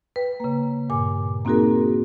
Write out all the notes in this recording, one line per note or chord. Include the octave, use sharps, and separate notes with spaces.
B4 G5
C#3 A#3
G2 A#2 G#5 D6
A#3 C4 D#4 F#4 G#4 A#4